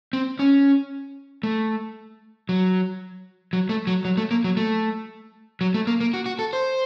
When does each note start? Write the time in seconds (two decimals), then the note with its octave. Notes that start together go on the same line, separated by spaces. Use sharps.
0.13 C4
0.39 C#4
1.43 A3
2.49 F#3
3.53 F#3
3.69 A3
3.87 F#3
4.05 F#3
4.17 A3
4.31 A#3
4.44 F#3
4.57 A3
5.61 F#3
5.74 A3
5.87 A#3
6.01 A#3
6.14 F#4
6.26 F#4
6.39 A4
6.53 C5